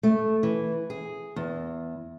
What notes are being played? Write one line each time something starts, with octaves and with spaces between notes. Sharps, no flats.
A3
E3
G#4
E2